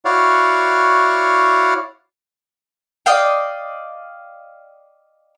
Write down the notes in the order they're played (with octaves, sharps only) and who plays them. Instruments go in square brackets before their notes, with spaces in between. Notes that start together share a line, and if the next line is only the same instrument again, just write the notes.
[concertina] E4 F#4 C#5 D5 F5 F#5
[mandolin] D5 D#5 F5 G5